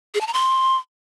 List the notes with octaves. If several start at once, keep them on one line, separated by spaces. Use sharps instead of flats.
G#4
A5
A#5
C6